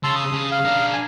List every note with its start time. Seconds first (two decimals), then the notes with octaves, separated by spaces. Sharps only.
0.04 C#3 A5 C6 E6
0.15 D#6
0.33 C#3
0.52 F5
0.65 D4 A#4
0.93 G#5